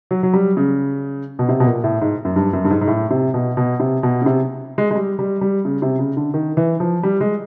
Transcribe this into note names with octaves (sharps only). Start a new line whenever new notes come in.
F#3
F#3
G3
C#3
B2
C3
B2
A#2
A2
G#2
F#2
G2
F#2
G2
G#2
G#2
A2
C3
B2
B2
C3
B2
C#3
C3
G#3
G#3
G3
G3
G3
C#3
C3
C#3
D3
D#3
E3
F3
G3
G#3